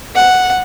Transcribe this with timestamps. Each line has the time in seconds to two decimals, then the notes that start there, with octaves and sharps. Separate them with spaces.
0.15 F#5